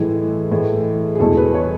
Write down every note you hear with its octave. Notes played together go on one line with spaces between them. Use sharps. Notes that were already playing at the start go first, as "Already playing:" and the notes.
Already playing: A2 E3 G#3
A2 E3 G#3
G#4
E2 B2 G#3 A4
B4
C#5